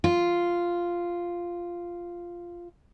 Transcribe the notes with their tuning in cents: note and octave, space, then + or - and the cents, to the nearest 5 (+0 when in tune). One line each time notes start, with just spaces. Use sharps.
F4 -5